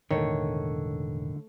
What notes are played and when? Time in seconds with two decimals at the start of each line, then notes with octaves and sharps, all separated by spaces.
0.11 E1 A1 A2 D3 D#3 A3 C#5